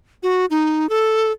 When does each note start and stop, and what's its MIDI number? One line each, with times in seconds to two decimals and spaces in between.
0.23 0.45 66
0.51 0.89 63
0.89 1.31 69